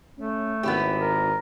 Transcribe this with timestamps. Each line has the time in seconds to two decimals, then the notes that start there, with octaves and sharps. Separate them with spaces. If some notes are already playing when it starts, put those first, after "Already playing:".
0.18 A3 C#4
0.63 G#1 B3 E4 G4
1.01 A#4